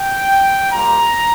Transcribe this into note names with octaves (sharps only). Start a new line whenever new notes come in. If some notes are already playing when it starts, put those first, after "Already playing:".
Already playing: G5
G3 A#3 F4 A#5